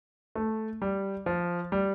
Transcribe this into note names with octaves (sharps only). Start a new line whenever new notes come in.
A3
G3
F3
G3